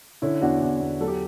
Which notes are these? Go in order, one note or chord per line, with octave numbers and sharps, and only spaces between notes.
D3 C#4 E4
E2 D4 F#4
E2
E2
F#3 A4
G4